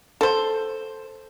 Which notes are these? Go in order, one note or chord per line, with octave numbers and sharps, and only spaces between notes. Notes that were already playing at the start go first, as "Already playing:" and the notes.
A4 C5